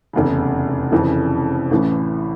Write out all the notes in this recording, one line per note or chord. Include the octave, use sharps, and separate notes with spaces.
F1 E2 C#3
F1 F2 C#3 E3
A1 A2 E3